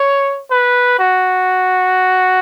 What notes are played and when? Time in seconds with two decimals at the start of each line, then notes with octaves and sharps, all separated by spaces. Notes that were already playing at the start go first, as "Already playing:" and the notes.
Already playing: C#5
0.51 B4
0.99 F#4